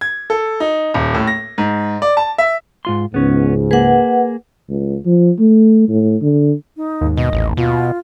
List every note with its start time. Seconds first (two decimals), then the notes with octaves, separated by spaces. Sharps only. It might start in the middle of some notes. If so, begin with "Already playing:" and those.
0.01 G#6
0.30 A4
0.60 D#4
0.94 D#1
1.14 A2
1.27 A#6
1.58 G#2
2.02 D5
2.17 A5
2.38 E5
2.85 G#2 F4 C6
3.14 C#2 G#2 B3 C#4
3.71 A#3 G#4 B4 F#5
4.69 C#2
5.06 F3
5.39 A3
5.89 A2
6.22 D3
6.77 D#4
7.01 D#2 G#2
7.17 B2 D#5
7.33 A1
7.57 B2 F4